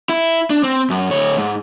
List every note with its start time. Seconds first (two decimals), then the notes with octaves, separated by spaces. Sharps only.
0.09 E4
0.50 D4
0.64 C4
0.90 F#2
1.11 D2 C#5
1.38 G#2